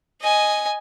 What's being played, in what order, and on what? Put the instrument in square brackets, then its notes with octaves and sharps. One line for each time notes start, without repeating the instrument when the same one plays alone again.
[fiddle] D#5 G#5